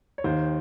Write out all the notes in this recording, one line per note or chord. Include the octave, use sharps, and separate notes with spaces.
C#5
D#2 D#3 C5